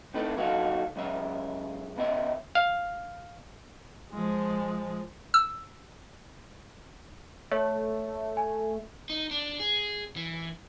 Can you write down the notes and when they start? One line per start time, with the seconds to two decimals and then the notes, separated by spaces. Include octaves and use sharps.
0.14 C3 A3 D#4 E4 A4 B4
0.37 F#3 A#3 D#4 F#4 A4 F5
0.96 C#2 F#2 C#3 E5
1.97 C#3 B3 D#5 E5
2.55 F5
4.12 F3 G#3
5.34 E6
7.52 A3 C#5
8.37 G#5
9.10 D#4
9.31 D4
9.60 G#4
10.16 E3